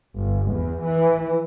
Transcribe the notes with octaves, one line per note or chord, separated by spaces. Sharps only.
G1
E2
E3